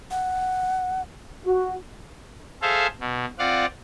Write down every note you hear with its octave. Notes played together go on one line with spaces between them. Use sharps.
F#5
F#4
G#4 A4 C5 E5 F5
B2
C4 F4 D5 F5 F#5